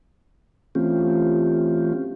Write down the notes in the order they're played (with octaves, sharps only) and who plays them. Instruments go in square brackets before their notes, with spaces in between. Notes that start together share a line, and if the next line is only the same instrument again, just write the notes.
[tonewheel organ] E3 A3 C4 C#4 F4 G4